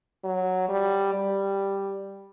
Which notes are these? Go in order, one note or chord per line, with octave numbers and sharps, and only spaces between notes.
F#3
G3
G3